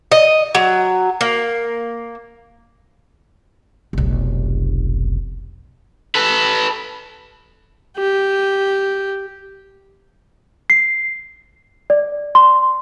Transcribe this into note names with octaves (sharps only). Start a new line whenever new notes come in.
D#5
F#3
A#3
F1 B1
A4 B4
G4
C7
D5
C6